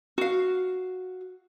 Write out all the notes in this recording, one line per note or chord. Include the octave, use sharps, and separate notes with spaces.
F#4 F5